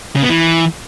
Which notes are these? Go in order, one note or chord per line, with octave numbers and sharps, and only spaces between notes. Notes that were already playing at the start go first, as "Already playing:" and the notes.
C#3
B3
E3